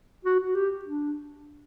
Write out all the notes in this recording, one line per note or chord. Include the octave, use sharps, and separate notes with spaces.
F#4
F#4
G4
D4